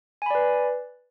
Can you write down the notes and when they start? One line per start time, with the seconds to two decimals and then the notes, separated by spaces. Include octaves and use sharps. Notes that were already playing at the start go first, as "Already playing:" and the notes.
0.22 G#5
0.26 B5
0.30 D5
0.35 B4